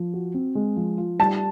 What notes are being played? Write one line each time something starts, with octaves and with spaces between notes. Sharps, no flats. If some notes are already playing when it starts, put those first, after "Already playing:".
Already playing: F3
F#4
C4
G#3
F3
F4
G3 A5